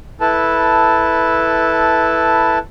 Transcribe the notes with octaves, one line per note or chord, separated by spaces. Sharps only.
E4 A4 B4 A5